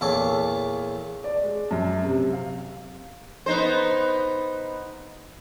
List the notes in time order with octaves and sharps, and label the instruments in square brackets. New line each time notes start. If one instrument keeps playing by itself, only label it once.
[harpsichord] E2 A#2 A4 C#5 D6
[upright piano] D5
G#3
F#2
C3
F5
[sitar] B3 D#4 C5